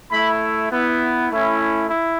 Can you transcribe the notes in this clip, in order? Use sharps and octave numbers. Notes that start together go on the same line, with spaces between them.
A3 E4 B5
B3 E4
A3 C#4 E4
E4